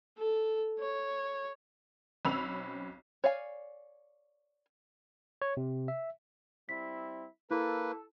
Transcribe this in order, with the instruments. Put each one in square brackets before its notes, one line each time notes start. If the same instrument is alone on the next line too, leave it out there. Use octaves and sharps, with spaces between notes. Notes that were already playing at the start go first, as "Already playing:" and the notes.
[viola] A4
C#5
[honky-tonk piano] B1 C4 C#4 B5 E6 F7
[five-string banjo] C#5 D5 F5 G#5
[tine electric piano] C#5
C3
E5
[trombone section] G3 C4 E4 [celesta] B6
[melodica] A#3 B4 [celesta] E4 [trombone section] A4